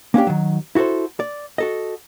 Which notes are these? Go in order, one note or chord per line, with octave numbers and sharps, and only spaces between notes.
A#3 C#4 D4 G4
D#3 F#3
E4 F#4 G#4 A4 C5
D5
F#4 A4 D#5